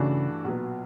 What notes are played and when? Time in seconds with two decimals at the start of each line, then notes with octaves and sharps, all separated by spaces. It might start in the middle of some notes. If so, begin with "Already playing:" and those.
Already playing: G2 C#3 E3 A3 D4 F#4
0.44 B1 A#2 F#3 B3